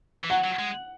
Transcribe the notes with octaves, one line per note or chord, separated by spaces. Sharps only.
E3
F#3 F#5
F#3
G#3